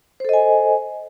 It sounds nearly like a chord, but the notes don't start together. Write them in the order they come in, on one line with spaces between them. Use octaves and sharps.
C5 A4 D#5 G#5